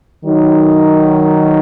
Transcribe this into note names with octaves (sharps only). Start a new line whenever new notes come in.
D#3 F#3 D#4